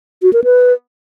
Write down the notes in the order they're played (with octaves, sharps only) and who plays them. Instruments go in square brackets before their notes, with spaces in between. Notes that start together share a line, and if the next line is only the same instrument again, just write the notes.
[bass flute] F#4
A#4
B4